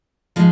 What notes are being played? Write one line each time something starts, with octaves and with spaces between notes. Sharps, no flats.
F3 G#3 D#4